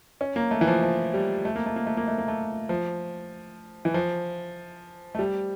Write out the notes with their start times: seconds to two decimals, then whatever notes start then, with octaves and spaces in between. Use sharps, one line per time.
0.21 C#4
0.36 A#3
0.51 A3
0.61 E3
0.67 F3
0.83 F3
1.14 G3
1.45 A3
1.55 A#3
1.66 A3
1.76 A#3
1.87 A3
1.97 A#3
2.07 A3
2.18 A#3
2.28 A3
2.69 F3
3.85 E3
3.94 F3
5.15 A3
5.19 G3